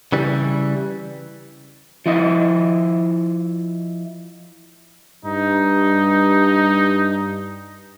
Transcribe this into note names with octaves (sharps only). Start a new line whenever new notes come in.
C#3 E3 G3
F3 E4 D#5
G2 D#4